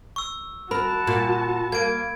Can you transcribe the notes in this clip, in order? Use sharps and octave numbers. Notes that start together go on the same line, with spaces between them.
C#6 E6
F#4 A#4 A5 B5
A#2
A#3 G#6 D7